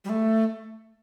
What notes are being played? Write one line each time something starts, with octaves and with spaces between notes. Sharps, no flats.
G3
A3